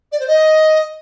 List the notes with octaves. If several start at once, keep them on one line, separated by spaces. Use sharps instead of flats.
D5
C5
D#5